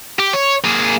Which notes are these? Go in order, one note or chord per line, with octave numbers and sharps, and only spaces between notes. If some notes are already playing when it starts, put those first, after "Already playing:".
G4
C#5
A#3 G#4